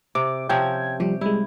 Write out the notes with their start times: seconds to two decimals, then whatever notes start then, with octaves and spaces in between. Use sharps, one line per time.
0.15 C3 D6
0.49 C3 F3 C#4 G5 G#6
1.00 F3 G3 G4
1.21 G3 G#3 E4